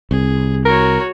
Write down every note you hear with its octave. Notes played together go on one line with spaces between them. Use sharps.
C2 G#4
F#4 A#4 C#5